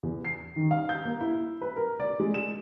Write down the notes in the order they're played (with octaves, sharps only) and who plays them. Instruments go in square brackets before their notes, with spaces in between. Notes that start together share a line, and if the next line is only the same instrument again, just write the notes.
[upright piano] E2
C7
D#3
F5
G6
A#3
E4
B4
A#4
D5
G#3
E7